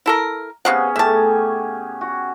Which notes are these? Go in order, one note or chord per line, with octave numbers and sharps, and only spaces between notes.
E4 A4 A#4
C3 B3 C#4 G#4 F5 F#5
A2 G4 E5 G#5 A5
F#4